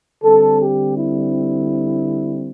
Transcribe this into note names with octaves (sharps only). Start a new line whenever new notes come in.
D3 G3 C4 A4
G4
E4